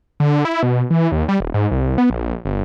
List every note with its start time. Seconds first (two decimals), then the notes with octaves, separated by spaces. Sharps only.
0.20 D3
0.45 E4
0.63 B2
0.90 E3
1.12 D#2
1.29 G3
1.40 D#1
1.54 G#2
1.71 C2
1.98 B3
2.10 A#1
2.45 G1